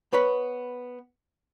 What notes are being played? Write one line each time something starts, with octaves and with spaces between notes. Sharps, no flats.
B3 B4 C#5 B5